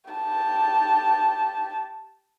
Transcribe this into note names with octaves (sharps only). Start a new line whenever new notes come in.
G4 A5